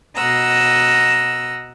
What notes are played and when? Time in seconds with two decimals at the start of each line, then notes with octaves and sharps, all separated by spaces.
0.15 B2 D#5 F#5 A#5 E6